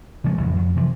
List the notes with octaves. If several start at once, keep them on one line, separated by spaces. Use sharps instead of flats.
C#3 F3 G#3 A3
A1 F2 C#3
F2
C3 E3 F3